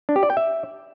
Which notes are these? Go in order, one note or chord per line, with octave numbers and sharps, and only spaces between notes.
D4
G4
D5
G5
E5